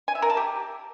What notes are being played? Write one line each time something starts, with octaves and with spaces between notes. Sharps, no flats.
G#5
E5
A#4
A5
G4